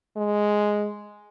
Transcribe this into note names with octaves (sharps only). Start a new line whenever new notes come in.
G#3